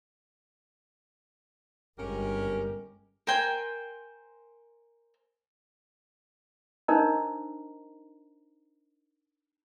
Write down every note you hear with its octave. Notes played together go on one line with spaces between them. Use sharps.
G1 G#3 C#4 G4 A#4
A#4 C5 G5 G#5
D4 D#4 A#4 C5 D#5 A#5